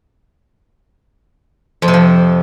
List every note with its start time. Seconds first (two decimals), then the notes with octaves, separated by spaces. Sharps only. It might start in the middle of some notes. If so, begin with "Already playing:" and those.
1.82 F2
1.88 C3
1.94 F3